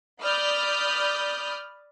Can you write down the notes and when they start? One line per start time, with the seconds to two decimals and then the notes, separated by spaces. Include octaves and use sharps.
0.22 D5 B5 D#6 F6 G6